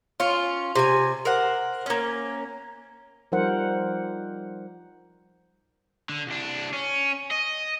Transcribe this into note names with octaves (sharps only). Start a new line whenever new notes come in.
C#4 F4
C3 G#5
A#4 C5 F#5
A#3 C#4
F3 G3 D#4 A#4 C5 F#5
D3
C2 D4
C#4
D#5